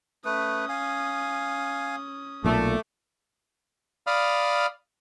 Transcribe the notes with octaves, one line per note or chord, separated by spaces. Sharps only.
A3 C#4 B4 D#6
F5 G#5
B1 A#2 A3 D6
D5 F5 B5 D#6 F6